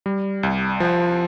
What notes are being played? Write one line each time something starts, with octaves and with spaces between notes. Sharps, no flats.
G3
C2
F3